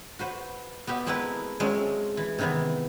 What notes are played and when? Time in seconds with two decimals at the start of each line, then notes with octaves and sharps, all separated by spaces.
0.19 F#4 B4 C5
0.87 B3 F#4 G4 E5
1.06 G#3 A3 C4 E4 A#4 B4
1.60 F#3 G#3 A3 C4 C#4 F4
2.17 E3
2.38 C3 D#3 E3 B3 C4